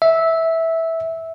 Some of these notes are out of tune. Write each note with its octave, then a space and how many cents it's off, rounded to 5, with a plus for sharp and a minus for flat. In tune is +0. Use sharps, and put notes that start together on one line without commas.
E5 -10